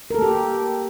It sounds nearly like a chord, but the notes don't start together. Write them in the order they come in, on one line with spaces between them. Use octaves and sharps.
A#4 A4 A#3 G4